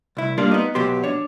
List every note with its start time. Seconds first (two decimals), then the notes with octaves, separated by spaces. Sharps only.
0.17 C2 E4
0.38 G3 A#3 D4 F4
0.52 B3 D#4
0.75 B1 F#3 B3 G4 C6
1.04 D4 C#5